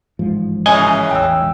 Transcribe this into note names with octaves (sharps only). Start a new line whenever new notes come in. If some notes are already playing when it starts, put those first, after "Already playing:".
A1 G#2 F3
F#2 C#3 E3 D#5 G#5
A1 E2 G5 E6